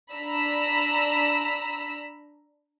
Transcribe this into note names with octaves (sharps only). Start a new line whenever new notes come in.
D4 A#5 B5 E6 B6